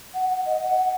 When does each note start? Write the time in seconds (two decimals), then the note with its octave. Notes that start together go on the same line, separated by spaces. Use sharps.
0.14 F#5
0.30 F#5
0.46 D#5
0.62 F#5
0.78 F#5